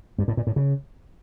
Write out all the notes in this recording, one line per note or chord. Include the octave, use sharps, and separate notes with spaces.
G2
A2
A#2
A2
C#3